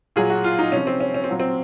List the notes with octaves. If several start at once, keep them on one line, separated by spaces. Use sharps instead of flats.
A#2 F#3 G#4
F#4
F4
D#4
C3 F3 C#4
C4
C#4
C#4
C4
A#2 F#3
C4